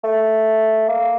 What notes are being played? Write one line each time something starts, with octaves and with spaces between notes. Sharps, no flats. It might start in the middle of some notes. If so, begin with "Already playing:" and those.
A3
A#3